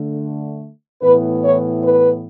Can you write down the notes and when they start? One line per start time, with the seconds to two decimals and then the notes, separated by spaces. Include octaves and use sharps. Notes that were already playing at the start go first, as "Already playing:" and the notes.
Already playing: D3 A3
1.01 A2 E3 B3 B4
1.42 C#5
1.83 B4